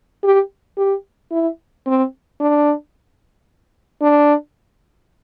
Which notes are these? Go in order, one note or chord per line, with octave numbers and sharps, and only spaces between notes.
G4
G4
E4
C4
D4
D4